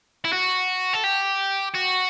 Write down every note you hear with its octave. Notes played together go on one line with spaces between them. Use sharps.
E4
F#4
A4
G4
F#4